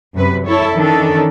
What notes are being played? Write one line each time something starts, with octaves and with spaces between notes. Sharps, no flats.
F#2 C3 B4
E4 A4 C#5
D#3 E3 C#4 D4 A4